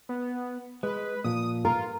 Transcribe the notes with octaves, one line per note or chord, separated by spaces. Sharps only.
B3
G#3 B4
A#2 F3 D#6
F4 A#4